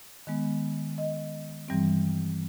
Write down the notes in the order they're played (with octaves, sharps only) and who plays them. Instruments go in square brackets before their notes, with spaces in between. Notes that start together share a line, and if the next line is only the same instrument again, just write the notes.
[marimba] D#3 G#3 B3
D#5
G2 E3 G3 C4